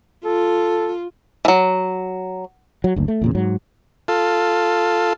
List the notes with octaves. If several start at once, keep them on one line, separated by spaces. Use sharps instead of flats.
F4 A4
E3 F#3
F#3
F#1 D2
A3
E2 A#2 C#3
G#2 F#3
F4 A4